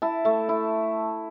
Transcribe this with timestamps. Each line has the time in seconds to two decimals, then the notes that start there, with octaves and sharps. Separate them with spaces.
0.02 E4 A5
0.25 A3
0.49 E4